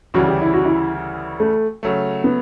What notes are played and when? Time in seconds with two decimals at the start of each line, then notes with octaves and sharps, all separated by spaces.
0.14 D2 C#3 E3 G3 F#4
0.28 G4
0.42 E4
0.54 F#4
0.65 E4
1.40 A3
1.83 C#3 F#3 A3
2.24 B3